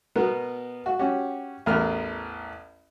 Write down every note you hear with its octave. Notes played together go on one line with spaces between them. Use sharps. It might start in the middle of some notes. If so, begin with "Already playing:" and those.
B2 B3 A#4
F#4
C#4 F#4 G4
A1 E2 A#4 F6